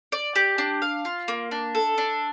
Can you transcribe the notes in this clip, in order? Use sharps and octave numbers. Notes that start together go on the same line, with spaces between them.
D5
G4
D4
F5
F4
A#3
D4
A4
D4